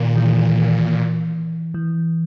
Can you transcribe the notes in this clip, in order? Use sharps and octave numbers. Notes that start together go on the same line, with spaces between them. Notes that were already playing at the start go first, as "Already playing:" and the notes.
Already playing: A#2 D#3
E3
E3